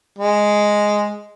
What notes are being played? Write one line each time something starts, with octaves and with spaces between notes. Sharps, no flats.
G#3